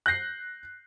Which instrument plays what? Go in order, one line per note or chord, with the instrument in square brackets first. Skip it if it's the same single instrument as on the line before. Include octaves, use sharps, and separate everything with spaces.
[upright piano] F#6 G6 A#6 C7